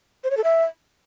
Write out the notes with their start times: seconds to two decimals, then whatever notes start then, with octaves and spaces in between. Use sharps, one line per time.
0.24 C5
0.31 C#5
0.37 A4
0.44 E5